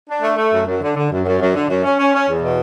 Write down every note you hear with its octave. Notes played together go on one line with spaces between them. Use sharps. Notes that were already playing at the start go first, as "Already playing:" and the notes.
D4
A3
A3
F#2
F#2
D3
D3
F#2
F#2
F#2
D3
F#2
C#4
C#4
C#4
E2
B2